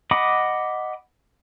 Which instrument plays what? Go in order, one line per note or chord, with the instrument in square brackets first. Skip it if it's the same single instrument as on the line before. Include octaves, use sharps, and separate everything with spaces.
[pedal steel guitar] D#5 F#5 B5 D6 D#6